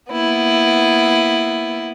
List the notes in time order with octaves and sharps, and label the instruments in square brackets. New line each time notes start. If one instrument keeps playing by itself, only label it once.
[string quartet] A#3 B3 E4